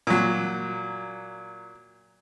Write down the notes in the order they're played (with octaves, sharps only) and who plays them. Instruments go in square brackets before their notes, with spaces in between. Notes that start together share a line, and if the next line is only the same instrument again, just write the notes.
[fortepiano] A#2 F#3